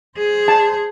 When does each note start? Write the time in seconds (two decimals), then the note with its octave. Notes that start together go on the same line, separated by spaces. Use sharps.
0.17 G#4 C5
0.48 A5